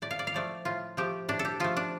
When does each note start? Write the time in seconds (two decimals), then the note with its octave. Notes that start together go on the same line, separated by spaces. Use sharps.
0.02 A2 D5
0.11 F5
0.19 D5
0.27 F5
0.34 F3 A3 D5
0.65 A2 F4
0.97 F3 A3 G4
1.29 A2 D4
1.39 A4
1.45 G4
1.60 F3 A3 F4
1.77 D4